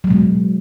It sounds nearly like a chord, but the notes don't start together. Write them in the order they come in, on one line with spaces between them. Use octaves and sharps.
F#3 G#3 B2